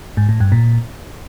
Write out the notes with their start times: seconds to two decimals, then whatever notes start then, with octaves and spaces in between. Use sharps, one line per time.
0.17 G#2
0.29 A2
0.40 G2
0.52 A#2